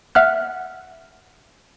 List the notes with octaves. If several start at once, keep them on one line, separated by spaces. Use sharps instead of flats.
E5 F#5 F6 F#6